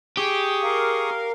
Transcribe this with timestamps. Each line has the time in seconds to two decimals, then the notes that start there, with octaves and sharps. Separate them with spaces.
0.17 G4 G#4 C#6 D#6
0.63 A#4 F5